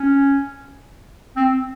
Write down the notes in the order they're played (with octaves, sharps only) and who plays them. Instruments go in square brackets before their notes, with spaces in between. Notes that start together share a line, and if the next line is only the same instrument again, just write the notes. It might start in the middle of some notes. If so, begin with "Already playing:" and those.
Already playing: [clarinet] C#4
C4